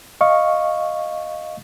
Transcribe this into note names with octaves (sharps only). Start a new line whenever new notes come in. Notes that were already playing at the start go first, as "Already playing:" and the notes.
D#5 F5 C#6